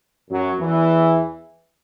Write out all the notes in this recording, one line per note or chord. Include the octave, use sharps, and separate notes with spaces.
F#2 F#3
E2 E3